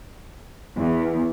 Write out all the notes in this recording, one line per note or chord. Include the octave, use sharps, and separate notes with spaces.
E2